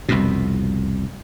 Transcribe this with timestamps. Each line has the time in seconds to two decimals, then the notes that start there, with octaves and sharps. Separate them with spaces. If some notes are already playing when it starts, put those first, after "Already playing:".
0.09 C2 F2 B2